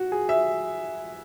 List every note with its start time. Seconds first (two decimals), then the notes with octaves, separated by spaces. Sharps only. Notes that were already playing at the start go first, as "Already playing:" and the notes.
Already playing: F#4
0.12 G#4
0.29 E5